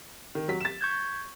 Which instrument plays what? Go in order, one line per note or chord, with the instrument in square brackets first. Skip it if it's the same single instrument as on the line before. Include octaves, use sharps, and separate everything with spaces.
[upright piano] D#3
F#3 B6
A6 E7
[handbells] C#6 G6 G#6